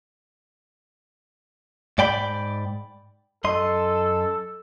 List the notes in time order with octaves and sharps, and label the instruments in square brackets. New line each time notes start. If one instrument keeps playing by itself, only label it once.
[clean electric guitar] G#2 D5 G5 B5
[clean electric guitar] F#2 D#5 C6 [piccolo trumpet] A4